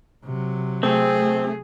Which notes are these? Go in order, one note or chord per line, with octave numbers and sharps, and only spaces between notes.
C3 F#3
A3 C4 G#4